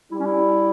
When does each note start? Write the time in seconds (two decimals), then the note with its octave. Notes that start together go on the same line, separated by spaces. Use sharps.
0.11 G3 E4
0.19 C#4
0.26 E4